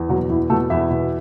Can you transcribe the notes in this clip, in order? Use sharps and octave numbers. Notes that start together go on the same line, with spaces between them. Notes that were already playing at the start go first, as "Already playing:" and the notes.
Already playing: E2
B2 F#3 F#4
E2 E4
B2 A3 A4
E2 E4 E5
B2